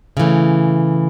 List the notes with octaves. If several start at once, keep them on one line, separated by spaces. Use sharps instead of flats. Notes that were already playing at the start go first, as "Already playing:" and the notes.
C#3 E3 A3